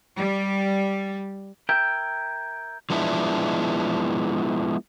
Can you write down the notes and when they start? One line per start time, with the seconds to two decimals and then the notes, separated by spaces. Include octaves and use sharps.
0.17 G3
1.69 A#4 E5 G5 G6 G#6
2.90 F3 G#3 B3 D4 E4